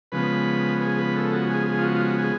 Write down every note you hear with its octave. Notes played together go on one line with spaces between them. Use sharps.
C#3 F3 G#3 B3 B4
G#4
B4
A4
F#4
G#4
G#4
F4
F#4
F4
F#4
G#4